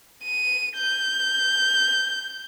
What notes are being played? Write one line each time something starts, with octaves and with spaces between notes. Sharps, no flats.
D#7
G6